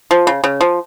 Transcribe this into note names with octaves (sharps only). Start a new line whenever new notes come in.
F3
C#3
C#3
F3